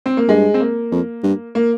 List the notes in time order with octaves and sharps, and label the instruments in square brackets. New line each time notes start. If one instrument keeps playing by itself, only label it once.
[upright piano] C4
A#3
[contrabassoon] G2 [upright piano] G#3
[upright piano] C4
A#3
[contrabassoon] F2
G2
[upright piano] A#3